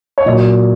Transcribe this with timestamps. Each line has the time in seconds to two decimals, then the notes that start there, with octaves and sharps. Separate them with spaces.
0.18 C#5
0.25 A#2 F#3 D#5